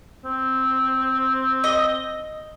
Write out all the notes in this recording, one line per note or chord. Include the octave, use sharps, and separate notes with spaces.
C4
D#5